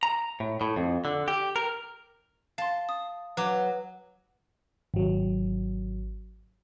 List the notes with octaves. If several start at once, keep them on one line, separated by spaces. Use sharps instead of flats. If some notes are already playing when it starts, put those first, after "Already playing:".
A#5
A2
A2
F2
D3
G4
A#4
F5 A5 C6
D#6
F#3 B4 D6 F#6
G#1 F#3